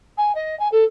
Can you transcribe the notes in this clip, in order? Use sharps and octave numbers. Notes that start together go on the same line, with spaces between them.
G#5
D#5
G#5
A4